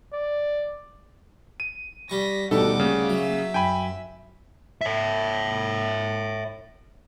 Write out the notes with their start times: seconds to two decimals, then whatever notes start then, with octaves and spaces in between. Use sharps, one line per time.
0.13 D5
1.60 D#7
2.10 G3 C#6 A#6 B6
2.51 D2 B2 D#3 G3 D#4 A4 F#5 D6
2.80 C#3 A#3
3.10 F#3 E5
3.54 F#2 G5 G#5 B5
4.81 C#5 E5